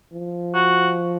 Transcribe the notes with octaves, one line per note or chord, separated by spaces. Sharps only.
F3
F#4